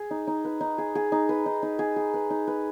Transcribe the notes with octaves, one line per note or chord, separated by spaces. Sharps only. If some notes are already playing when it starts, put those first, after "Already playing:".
Already playing: G#4
D#4
D#4
B4
D#4
G#4
G#4
D#4
B4
D#4
D#4
G#4
G#4
B4
D#4
B4